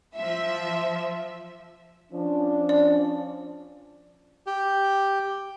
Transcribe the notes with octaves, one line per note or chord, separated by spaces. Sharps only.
F3 E5
F3 C#4 D4
D5
G4